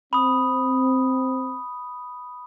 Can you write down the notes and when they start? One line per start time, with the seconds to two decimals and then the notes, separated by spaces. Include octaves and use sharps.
0.13 C4 B5 D#6